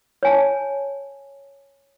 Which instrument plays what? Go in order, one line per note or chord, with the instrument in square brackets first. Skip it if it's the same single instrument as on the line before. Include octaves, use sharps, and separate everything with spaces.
[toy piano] C#5 G#5 A5